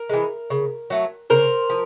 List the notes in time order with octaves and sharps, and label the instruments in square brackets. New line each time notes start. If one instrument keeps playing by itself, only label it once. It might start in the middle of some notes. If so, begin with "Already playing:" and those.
Already playing: [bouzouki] A#4
E3 G#3
C#3
F#3 A3
C#3 A#4 C5
F3